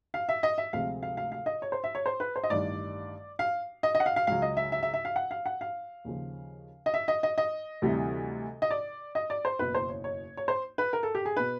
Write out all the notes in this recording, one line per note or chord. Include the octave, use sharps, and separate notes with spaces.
F5
E5
D#5
E5
D2 C3 F3 G#3 F5
F5
F5
F5
D#5
C#5
C5
E5
C#5
C5
B4
C5
D#5
A1 G2 D#3 D5
F5
D#5
D#5
F#5
F5
F5
C#2 C#3 F#3 F5
D#5
E5
E5
E5
E5
F5
F#5
F5
F#5
F5
D#2 C#3 F3
D#5
E5
D#5
D#5
D#5
D2 C3 E3 G3
D#5
D5
D#5
D5
C5
F#1 E2 B2 B4
C5
C#5
C#5
C#5
C5
B4
A#4
A4
G4
G#4
B2 B4